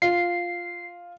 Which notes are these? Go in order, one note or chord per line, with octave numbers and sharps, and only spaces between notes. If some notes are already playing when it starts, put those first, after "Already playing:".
F4 C7